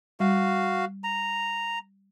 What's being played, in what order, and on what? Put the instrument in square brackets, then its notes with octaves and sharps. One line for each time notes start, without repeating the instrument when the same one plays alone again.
[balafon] G3 [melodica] F#4 F5
[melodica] A#5